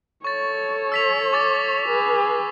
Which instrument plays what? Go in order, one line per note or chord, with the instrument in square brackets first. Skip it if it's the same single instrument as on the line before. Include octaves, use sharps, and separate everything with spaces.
[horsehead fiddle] A4 C#5 [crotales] C#6 A6
[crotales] E6 B6 F7
C#6 D6 A6
[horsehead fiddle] G#4 B4